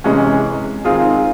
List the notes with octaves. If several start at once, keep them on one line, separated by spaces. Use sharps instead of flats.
C3 E3 G#3 C#4
D#3 G#3 C4 F4 G#4